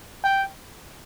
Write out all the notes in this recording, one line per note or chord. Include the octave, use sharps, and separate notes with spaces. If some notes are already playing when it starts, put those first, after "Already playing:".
G5